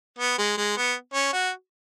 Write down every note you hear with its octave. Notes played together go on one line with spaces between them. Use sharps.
B3
G#3
G#3
B3
C#4
F#4